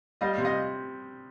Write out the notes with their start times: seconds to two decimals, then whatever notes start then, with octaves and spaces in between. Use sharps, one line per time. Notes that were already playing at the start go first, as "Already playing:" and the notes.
0.21 G3 D#5 F5
0.38 C3
0.45 D#5 F5